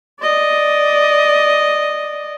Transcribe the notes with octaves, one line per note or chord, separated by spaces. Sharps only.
D5 D#5